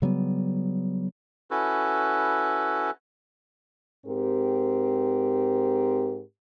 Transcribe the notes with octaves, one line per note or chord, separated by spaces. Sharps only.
C#3 F#3 G3 B3
C#4 E4 F#4 A4 B4
G#2 C4 G4 A#4